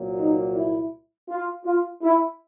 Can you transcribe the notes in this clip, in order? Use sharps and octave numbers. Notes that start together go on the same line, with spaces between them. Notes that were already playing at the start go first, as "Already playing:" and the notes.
Already playing: C2 A#2 F#3 A#3
D#4
E4
F4
F4
E4